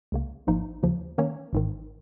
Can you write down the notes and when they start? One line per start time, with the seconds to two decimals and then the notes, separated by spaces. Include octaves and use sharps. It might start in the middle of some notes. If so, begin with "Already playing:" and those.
0.12 C#2 C#3 A#3
0.47 G#1 G#2 F3 A#3 D#4
0.83 D#2 C#3 F3
1.18 D#3 A#3 C#4 A#4 C#5
1.53 G#1 G#2 D#3